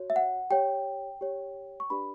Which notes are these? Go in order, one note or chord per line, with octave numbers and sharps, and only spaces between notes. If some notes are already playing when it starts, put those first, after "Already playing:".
Already playing: F#4 C#5
E5
F#5
G4 C#5 G5
G4 C#5
C#6
D4 G4 B4 D5 B5